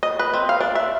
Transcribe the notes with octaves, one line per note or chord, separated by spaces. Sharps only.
D#5
B4
C4
F5
D4
E5